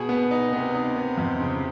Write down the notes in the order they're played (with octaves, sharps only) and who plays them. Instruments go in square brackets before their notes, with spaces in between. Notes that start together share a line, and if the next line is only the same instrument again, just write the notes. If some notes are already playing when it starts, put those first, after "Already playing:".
Already playing: [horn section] B2 [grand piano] G#4
[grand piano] B3
D#4
[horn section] C3 [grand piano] B3
[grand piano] D#4
B3
F2
C#3